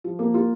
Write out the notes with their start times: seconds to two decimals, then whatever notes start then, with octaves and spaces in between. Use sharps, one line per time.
0.04 F3
0.19 A#3
0.34 F4